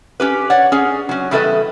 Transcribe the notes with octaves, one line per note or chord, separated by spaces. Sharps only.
C#4 G4 B4
C#5 D5 F#5
C#4 G#4
F#3 C#4
E2 G3 E4 A4 B4 D#5